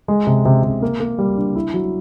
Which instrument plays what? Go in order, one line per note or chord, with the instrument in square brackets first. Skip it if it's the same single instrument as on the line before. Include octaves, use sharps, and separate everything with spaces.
[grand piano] G#3
C3
C3
C3
A#3
A#3
G3
D4
E4
F#3